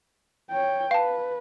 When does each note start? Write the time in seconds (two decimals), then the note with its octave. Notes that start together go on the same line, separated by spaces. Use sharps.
0.50 C#5 G5
0.91 B4 F5 A5